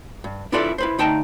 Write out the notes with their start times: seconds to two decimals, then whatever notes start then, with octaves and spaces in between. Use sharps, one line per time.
0.24 G2
0.52 D4 E4 F4 A4 B4 D5
0.78 E4 B4 C5
0.98 D2 D#4 G5 A5 A#5